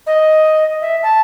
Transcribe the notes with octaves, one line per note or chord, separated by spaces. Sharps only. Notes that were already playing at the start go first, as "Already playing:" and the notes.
D#5
E5
A5